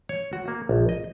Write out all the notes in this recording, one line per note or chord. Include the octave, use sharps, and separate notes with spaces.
C#5
F#4
A#3
A#1
D#5